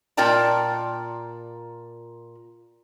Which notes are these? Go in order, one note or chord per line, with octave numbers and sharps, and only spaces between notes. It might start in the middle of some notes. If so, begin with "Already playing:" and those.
A#2 F4 A#4 D5 G5 A5